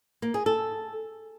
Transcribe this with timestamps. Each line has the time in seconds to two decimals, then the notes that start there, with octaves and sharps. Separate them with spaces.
0.22 A#3
0.34 G#4
0.46 A4